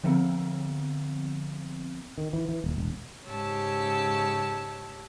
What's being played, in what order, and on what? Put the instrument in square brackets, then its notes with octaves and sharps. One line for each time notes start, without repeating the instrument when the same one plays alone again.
[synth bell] D3 F3 B3 C4
[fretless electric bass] D#3
E3
E3
D#1
E1
[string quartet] G#2 C#3 G4 C#5 A5 E6